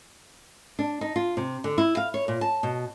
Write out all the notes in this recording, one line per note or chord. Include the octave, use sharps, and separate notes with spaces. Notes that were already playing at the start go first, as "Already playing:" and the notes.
D4
D#4
F4
C3
D3
E4
F5
C#5
A#2
A5
B2